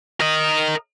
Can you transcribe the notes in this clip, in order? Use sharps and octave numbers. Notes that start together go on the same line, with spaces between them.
A#4 D#5